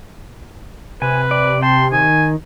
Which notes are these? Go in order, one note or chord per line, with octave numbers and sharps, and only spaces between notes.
C3 B4 G#5
D5
G5 A5 C6
D#3 G#5